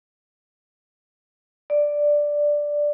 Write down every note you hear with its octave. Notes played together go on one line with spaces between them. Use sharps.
D5